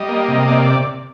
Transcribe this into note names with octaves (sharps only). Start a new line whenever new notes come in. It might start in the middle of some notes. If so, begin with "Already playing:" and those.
Already playing: G3 D#5
A#3
C3
A#3 D5
D5